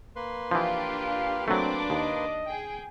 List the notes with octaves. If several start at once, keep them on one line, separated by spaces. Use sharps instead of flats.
A#3 B4 C6
E3 F3 D4 F4 G4 F5
F#3 A3 C4 D4 D6
D#2 D#5
G#4 G5